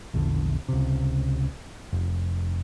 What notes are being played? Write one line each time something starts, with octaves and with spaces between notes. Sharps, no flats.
A#1 E2 D3
C#2 C3
F1